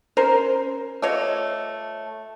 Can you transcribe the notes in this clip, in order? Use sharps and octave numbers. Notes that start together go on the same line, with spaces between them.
C#4 A#4 C5
A3 F4 C#5 D#5